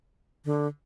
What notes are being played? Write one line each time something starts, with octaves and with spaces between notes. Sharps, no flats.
D3